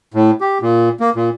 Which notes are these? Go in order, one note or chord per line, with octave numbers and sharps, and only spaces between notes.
A2
G4
A#2
A#3
A#2